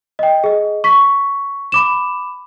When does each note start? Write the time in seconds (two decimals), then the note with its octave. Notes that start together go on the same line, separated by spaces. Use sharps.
0.19 D#5 G5
0.44 G#4 D#5
0.84 C#6 B6
1.72 B5 D6 E7